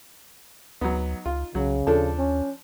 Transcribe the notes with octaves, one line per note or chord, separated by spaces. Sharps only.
D2 F#3 B3 D#4
C#2 F4
C2 C#3 F#3
D#2 F3 D4 A4
C#4